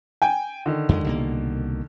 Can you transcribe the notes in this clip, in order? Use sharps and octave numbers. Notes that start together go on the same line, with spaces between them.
G5 G#5
D3 D#3
F2 F#3 G#3
C2 B2 A#3